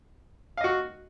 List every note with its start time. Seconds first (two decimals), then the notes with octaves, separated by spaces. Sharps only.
0.57 F5
0.61 D#5
0.64 F#4